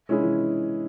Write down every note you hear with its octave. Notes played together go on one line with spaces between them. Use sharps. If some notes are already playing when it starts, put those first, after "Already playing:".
G#3 C#4 E4 G#4
E3